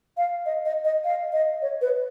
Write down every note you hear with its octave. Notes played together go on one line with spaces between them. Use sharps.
F5
D#5
D#5
D#5
F5
D#5
C#5
B4